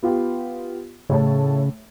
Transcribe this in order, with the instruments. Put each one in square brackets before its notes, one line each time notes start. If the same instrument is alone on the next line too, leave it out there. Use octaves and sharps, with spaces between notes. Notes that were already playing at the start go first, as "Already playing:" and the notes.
[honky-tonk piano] B3 F4 G4
[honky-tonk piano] A2 C#5 A5 [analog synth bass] C#3